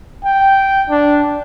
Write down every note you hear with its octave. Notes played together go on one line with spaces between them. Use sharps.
G5
D4